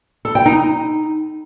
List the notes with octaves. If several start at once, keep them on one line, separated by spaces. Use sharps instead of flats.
A4
G5
D#4
D#4